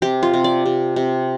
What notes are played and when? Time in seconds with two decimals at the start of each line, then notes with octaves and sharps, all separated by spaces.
0.02 C3 G4
0.23 F4
0.34 C3
0.44 D5
0.66 C3
0.96 C3